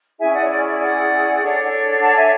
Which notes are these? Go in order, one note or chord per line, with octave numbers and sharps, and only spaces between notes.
C#4 E4 G#4 E5 G#5
D5 F#5
C#5
D5
D5
D5 F#5
D4 A4 C#5
F#5 A5
E5 G#5